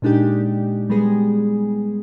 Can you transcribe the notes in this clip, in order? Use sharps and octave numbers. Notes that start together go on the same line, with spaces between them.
A#2 G#3 D4 D#4 G4
G3 G#3 B3 G#4